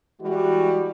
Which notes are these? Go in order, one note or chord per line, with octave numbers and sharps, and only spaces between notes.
E3 G3 G#3 F#4